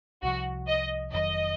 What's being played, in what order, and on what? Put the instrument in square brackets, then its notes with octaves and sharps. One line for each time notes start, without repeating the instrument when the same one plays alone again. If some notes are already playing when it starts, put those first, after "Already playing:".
[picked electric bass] C2 C3 F3 [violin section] F#4
[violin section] D#5
[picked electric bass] F1 F2 D#3 F#3 [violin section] D#5